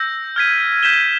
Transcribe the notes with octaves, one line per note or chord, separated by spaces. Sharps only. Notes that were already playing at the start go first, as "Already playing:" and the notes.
Already playing: E6 G6 A#6
F6 G#6 B6 D#7
G6 B6 E7 G7